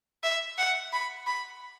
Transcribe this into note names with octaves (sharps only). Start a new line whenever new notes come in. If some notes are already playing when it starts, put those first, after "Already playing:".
E5
F#5
B5
B5